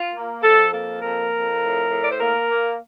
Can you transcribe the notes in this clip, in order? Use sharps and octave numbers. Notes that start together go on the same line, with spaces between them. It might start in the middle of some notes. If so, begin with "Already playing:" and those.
Already playing: F4
A#3
F2 A4
A#3 A4
F2 A#4
F2
A2
A2
D5
C5
A#3 A#4
A#3